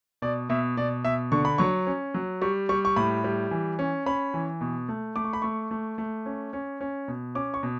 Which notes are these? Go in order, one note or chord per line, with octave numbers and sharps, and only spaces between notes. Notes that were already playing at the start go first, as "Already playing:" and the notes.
B2 D5
B2 E5
B2 D5
B2 E5
D3 C#6
B5
F#3 C#6
C#4
F#3
G3 C#6
G3 C#6
C#6
A2 B5
G3
E3
C#4
C#4 B5
E3
B2
A3
A3 D6
C#6
B5
A3 C#6
A3
A3
C#4
C#4
C#4
B2
C#4 D6
C#6
B2